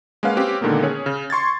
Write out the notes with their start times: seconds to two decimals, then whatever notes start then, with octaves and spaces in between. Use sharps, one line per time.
0.23 G#3 A#3 C#4 B4 F5 F#5
0.37 C4 C#4 G4 B4
0.61 A#2 D3 D#3 G#3 A#3 B3
0.83 C#4 G#4 C#5
1.06 C#3
1.30 C6 C#6 G#6 A6